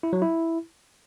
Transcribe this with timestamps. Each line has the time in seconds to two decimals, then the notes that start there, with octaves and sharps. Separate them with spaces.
0.03 E4
0.13 F#3
0.22 E4